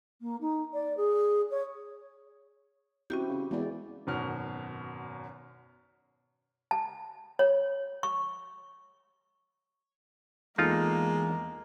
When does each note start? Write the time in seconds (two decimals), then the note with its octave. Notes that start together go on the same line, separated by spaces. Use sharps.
0.21 A#3
0.40 D#4
0.73 D5
0.97 G#4
1.50 C#5
3.10 C4 C#4 E4 F#4 G4 G6
3.29 C#3
3.51 E2 G#3 D5
4.07 G#1 F#2 B2 F6
6.71 A5
7.39 C#5
8.03 C#6
10.58 E2 G#3 A#3 D#4 F4 A4